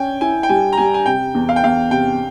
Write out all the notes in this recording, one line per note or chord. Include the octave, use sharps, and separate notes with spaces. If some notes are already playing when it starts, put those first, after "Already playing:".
Already playing: C#4 G5 G#5
E4 G#5
G5
G3 G#5
A#5
G3 G#5
G#5
C3 G5
E2
F5
G5
E2 F5
C3 G5